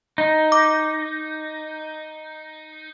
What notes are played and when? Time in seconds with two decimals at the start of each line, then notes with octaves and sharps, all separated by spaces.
0.18 D#4
0.52 D6